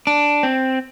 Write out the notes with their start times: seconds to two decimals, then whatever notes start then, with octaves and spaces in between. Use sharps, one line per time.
0.07 D4
0.43 C4